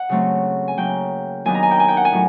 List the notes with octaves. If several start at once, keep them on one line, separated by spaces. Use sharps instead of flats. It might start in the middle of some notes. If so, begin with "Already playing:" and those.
Already playing: F#5
C#3 F#3 A3 C4
G#5
C#3 F#3 A#3 G5
D#2 D#3 F#3 B3 D4 G#5
A#5
G#5
G5
G#5
G5
F#5
G#5
A2 F#3